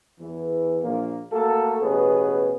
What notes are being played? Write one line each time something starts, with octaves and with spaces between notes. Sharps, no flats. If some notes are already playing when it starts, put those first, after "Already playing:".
E2 E3
A#1 A#2 A#3
A3 A#3 F#4 A4
A1 B2 B3 C#4 G#4 B4